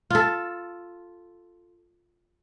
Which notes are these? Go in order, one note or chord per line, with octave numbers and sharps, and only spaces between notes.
F4 A4